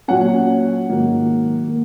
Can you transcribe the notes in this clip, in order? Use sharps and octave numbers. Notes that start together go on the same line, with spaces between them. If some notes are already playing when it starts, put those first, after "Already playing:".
A#2 F#3 C#4 F#5
G#2 D#3 F#3 A#3
A#3